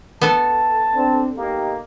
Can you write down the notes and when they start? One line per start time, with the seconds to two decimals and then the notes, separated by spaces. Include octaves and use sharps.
0.21 B3 A4 A5
0.95 C4 D4
1.37 A#3 D#4 G4